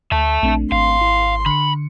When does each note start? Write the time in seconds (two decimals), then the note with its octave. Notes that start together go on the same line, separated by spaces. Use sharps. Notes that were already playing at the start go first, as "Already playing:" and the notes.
0.12 D2 E5 A5
0.43 A#1 A3 C4 D4
0.72 G#1 F5 C6
1.01 E4
1.46 D3 B5 C#7